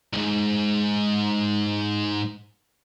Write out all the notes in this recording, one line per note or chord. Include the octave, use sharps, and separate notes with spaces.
C2 G#2